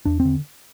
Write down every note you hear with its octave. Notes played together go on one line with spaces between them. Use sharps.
E2 D4
C4
D3